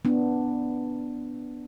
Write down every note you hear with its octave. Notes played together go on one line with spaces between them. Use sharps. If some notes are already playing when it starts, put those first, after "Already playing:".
B3 D4